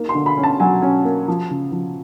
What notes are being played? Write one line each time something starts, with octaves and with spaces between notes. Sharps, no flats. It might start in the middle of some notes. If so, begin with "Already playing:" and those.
Already playing: A#3 D#4
C6
D3
B5
C#4
A5
F#3 G#5
C#4
A#3
F3
C#3
F3